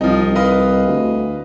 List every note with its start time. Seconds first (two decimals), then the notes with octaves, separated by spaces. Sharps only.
0.01 C2 F3 D#4
0.35 B4 D#5 F5
0.87 D2